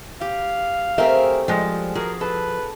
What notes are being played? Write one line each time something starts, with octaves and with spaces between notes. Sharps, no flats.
G4 F5
A3 C4 G4 G#4 A#4 E5
F3 G3 G#3
F3 F#4 G#4 A#4
A4 B4